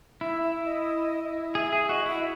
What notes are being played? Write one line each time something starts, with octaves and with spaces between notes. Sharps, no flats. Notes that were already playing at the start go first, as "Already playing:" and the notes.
E4 E5
E5
D#5
G#4 E5
G#4 E5
F#4 D#5
E4 E5